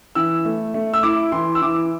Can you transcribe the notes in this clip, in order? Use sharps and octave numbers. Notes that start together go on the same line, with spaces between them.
E3 E6
A3
A3
E6
E4 D6
E3 C6
E6
E3 D6